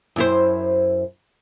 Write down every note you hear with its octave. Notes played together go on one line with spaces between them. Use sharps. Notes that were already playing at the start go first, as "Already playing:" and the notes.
F#2 E4 C5